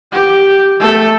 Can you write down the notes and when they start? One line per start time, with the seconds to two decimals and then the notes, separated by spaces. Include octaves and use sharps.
0.12 G4
0.80 A3 A4